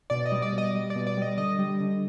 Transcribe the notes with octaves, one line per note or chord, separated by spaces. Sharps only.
B2 D5
D#5
G3
D5
B2
D#5
G3
D5
B2
D5
G3 D#5
D3 D#5
G3
D3